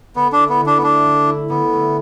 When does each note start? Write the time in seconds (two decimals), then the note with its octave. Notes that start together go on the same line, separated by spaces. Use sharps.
0.15 D3 B3
0.32 D4
0.38 E4
0.49 B3
0.61 D3
0.66 D4
0.78 B3
0.83 A3 D4
1.06 D3
1.27 E4
1.50 D3 B3
1.73 A3